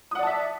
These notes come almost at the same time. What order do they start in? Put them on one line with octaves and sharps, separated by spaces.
D#6 F#5 D5 A5 E5